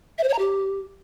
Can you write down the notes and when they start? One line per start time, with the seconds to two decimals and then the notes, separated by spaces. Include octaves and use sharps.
0.18 E5
0.23 C5
0.29 C#5
0.34 A#5
0.39 G4